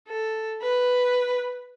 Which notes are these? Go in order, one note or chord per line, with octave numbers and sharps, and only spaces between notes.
A4
B4